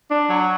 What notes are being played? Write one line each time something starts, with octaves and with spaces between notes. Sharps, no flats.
D4
F#3